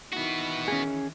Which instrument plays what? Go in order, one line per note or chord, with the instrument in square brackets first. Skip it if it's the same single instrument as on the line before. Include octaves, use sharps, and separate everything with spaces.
[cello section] D#3 E3 [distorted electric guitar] B3 F#4
[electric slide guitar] C#4 G#4